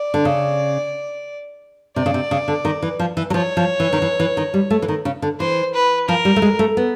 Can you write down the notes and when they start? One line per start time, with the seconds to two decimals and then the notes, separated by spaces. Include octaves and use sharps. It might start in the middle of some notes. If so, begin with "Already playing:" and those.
Already playing: D5
0.14 D3
0.25 C#3
1.96 C3 D5
2.06 C#3
2.14 C3
2.31 C#3
2.48 D3
2.65 D#3
2.82 E3
2.99 F3
3.17 E3
3.30 F#3
3.34 F3 C#5
3.57 F3
3.80 E3
3.93 D#3
4.02 E3
4.20 E3
4.37 D#3
4.54 G3
4.70 A3
4.82 E3
4.88 D#3
5.05 C#3
5.22 D3
5.40 E3 C5
5.74 B4
6.08 F3 A#4
6.25 G3
6.36 A3
6.42 G#3
6.59 A3
6.77 B3